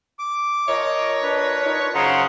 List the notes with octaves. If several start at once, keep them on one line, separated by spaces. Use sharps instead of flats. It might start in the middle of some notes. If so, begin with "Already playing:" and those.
D6
F3 A#4 C#5 D#5
D4 B4
D#4
F#2 C#3 C5 F#5 A#5 C6